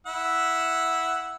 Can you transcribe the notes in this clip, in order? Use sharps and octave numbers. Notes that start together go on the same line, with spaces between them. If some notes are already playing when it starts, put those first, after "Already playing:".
E4 F#5 E6